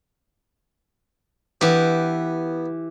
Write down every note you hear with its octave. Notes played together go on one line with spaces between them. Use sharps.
E3 B3 G4